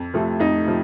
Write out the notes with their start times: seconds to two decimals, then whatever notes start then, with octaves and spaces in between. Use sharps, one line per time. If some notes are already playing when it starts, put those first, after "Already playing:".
Already playing: F2
0.14 C3 F3 A3
0.40 F2 D#4
0.67 C3 F3